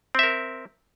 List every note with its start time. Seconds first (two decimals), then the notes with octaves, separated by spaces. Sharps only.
0.15 C4
0.19 E5
0.23 A#4